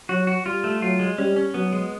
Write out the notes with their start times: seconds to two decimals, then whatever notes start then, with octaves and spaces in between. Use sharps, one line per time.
0.09 F#3 F#4
0.27 F#4
0.45 G3 F4
0.64 A3
0.82 F#3 F4
0.99 G#3
1.18 G3 C#4
1.36 C#4
1.54 F#3 B3
1.72 G#3